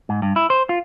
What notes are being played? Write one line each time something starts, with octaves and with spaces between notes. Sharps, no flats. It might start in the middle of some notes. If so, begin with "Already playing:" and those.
G#2
G2
E4
C5
F4